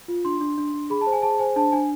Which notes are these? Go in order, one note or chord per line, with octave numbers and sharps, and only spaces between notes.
F4
D4 C6
D4
D4
D4
G#4 B5
A5
C5
G#5
G#4 A5
C5 G#5
D4 A5
D4 G#5